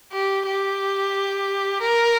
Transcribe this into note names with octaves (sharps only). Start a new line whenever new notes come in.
G4
G4
A#4